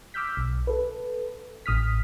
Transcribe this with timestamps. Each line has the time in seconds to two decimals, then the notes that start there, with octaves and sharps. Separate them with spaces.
0.14 D6 E6 F6 G6 B6
0.37 B1
0.67 A4 B4
1.66 A1 D#6 F6 B6